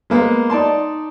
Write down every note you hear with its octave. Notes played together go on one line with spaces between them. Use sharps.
G#3 A#3 B3
D#4 D5 A5 C6